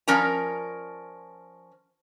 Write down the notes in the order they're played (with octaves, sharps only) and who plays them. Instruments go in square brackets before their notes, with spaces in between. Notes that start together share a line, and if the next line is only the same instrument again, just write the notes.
[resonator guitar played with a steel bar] F3 C#4 A#4 D5 A#5